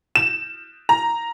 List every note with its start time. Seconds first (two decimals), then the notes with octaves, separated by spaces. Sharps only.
0.15 E7
0.89 A#5